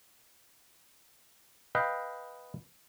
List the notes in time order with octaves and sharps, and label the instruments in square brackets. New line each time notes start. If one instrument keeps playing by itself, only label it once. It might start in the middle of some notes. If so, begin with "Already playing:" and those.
[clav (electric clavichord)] B4 D#5 F5 G5